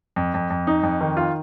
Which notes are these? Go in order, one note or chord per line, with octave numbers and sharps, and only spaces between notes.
F2
F2
F2
D#4
F2
D#3
F4